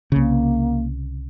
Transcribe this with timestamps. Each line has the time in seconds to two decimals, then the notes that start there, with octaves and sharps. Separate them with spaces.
0.12 C2 C#3 A#3